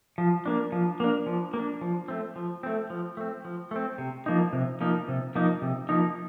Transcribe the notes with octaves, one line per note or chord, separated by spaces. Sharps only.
F3
A#3 D4
F3
A#3 D4
F3
A#3
D4
F3
A3 C4
F3
A3 C4
F3
A3 C4
F3
A3 C4
C3
F3 A#3 D#4
C3
F3 A#3 D#4
C3
F3 A#3 D#4
C3
F3 A#3 D#4